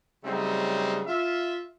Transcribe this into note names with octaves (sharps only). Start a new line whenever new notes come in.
C#3 F#3 G3 A3 C4 D#4
F4 E5